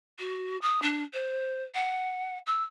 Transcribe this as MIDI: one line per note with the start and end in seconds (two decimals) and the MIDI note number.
0.19 0.57 66
0.61 0.80 87
0.82 1.03 62
1.13 1.63 72
1.74 2.38 78
2.46 2.63 88